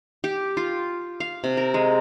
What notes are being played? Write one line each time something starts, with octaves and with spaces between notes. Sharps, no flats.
G4
F4
F5
C3
A#4
G#3